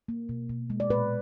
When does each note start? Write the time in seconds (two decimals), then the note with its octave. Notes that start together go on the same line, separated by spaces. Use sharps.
0.08 A#3
0.29 B2
0.49 B2
0.70 G#3
0.80 D5
0.90 A#2 B4